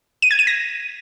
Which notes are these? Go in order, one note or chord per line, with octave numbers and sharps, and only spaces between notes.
D#7
G#6
D#7
A#6